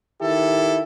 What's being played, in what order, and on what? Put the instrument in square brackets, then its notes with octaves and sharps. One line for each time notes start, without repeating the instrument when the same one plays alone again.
[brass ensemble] D#3 E4 G4 A4